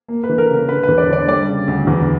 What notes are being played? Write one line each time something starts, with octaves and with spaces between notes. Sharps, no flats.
A#3
B4
E3
A#4
C#3 A#4
D3 B4
B4
E2
D5
D3 D5
G3 D5
C#3
D2
E2